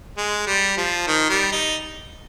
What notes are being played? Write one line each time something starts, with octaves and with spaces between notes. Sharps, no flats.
G#3
G3
F3
D#3
G3
D#4